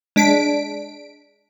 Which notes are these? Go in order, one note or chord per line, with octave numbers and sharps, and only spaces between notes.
G#3 D4 B6 D7